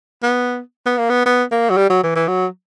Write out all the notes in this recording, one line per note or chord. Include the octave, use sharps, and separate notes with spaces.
B3
B3
A#3
B3
B3
A#3
F#3
G3
F#3
E3
E3
F#3